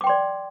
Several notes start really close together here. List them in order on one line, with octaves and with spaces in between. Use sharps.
D6 G5 C6 D5